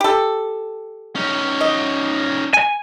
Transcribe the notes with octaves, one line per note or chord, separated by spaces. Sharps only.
G4 A4
C#4 D#4
D#5
G#5